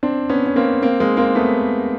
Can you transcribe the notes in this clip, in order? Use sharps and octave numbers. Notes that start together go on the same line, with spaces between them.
C4 D4
B3 C#4
C#4
A#3 C4
A#3 C4
G#3 A#3
A#3 C4
A3 B3